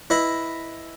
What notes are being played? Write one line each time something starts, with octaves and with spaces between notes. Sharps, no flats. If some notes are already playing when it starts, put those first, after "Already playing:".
E4 B4 D#5 B5